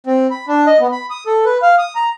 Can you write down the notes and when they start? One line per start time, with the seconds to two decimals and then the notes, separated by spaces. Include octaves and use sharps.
0.07 C4
0.31 B5
0.48 D4
0.67 D#5
0.80 B3
0.92 B5
1.10 D#6
1.27 A4
1.45 B4
1.62 F5
1.78 D#6
1.96 A#5